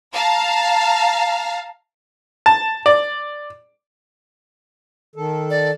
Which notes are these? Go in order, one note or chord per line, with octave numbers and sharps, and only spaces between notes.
F5 A5 A#5
A5
D5
D#3 A4
D5